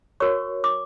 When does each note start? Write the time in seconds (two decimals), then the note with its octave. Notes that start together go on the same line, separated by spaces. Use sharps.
0.20 F#4 A#4 C#5 C#6
0.64 D6